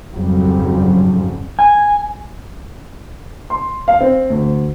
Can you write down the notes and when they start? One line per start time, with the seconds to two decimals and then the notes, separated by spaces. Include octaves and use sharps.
0.12 F2 G#2 C#3 F#3 G3
1.59 G#5
3.50 C6
3.88 F5
4.01 C4
4.30 D2